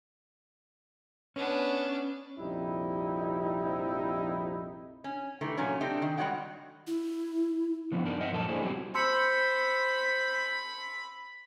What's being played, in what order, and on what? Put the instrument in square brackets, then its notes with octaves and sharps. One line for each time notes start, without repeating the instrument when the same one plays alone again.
[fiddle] B3 D4 [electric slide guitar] C#4
[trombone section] A#1 F2 C3 G3 D#4 E4
[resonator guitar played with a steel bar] C#4
D#3 E3 G3 A3
A#2 F#3 A3 C#4
A3 C4 D4 D#4 G4
D#3
G3 G#3 F#4 C#5 F#5 G5
[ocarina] E4
[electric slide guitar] D3 F3 B3 C4
G2 D4 D#4 A#4
C4 C5 D#5 E5 F#5
F#2 A#2 F3 A4 A#4 A5
A#3 D4 E4 G#4 C5
F#3 G3 C4 F#4 G4
[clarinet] C5 [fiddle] B5 [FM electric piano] C6 E6 C#7